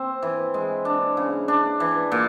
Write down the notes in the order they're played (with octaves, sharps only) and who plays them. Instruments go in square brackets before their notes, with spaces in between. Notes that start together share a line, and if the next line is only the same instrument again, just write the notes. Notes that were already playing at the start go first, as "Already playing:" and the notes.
Already playing: [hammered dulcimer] C4
E3
G#3
D4
C#3
D4
E3
A#2